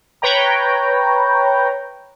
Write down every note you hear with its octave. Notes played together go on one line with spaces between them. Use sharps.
B4 C#5 G5 A#5